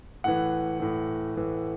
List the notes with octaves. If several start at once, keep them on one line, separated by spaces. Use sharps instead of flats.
A2 E3 F#5
A2 E3
A2 E3